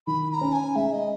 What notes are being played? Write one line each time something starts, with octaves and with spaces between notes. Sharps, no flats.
D#3 B5
B5
A#5
C#4
G#5
G#3 E5
D#5